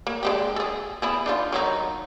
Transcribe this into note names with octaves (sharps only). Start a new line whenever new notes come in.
A#3
G#3 D4 G4
G#4 A4
B3 E4 G#4
D4 D#4 F4
D#3 F#3 D#4